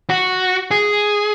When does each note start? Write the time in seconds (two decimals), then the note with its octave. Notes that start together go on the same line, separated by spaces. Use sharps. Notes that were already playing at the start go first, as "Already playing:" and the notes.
0.10 F#4
0.71 G#4